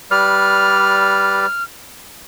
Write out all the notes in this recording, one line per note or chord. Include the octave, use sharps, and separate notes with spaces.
G3 B4 D5 F6